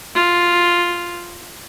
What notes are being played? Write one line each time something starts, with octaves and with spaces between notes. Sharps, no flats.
F4